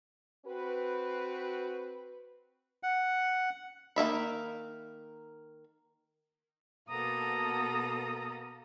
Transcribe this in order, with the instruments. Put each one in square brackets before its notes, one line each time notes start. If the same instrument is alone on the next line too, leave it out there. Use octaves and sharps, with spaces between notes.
[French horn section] C4 F#4 B4
[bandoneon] F#5
[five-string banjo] D#3 A#3 E5 B5
[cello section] B2 B3 A4 [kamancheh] A#3 D#6 [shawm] A#5